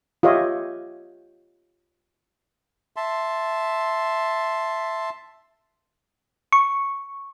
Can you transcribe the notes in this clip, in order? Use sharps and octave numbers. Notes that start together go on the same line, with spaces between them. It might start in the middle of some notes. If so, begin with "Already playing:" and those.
F4 G4 C#5 D#5 E5
E5 A5 C6
C#6